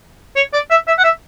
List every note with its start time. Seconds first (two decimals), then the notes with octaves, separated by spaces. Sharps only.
0.36 C#5
0.53 D5
0.70 E5
0.87 E5
0.98 F#5
1.04 E5